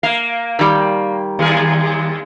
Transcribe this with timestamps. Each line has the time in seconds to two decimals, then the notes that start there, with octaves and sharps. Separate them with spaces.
0.03 A#3 F5
0.59 D#3 G3
1.39 D#2 G#4 A#4